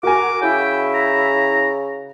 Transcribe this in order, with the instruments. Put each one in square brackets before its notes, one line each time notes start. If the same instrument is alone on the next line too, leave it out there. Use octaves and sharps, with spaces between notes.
[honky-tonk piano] F#4 G#5 [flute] A#4 [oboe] D6
[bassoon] C#3 [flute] E4 [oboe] G5
[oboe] A#5